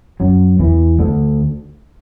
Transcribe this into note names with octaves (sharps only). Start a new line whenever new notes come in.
F#2 F#3
E2 E3
D2 D3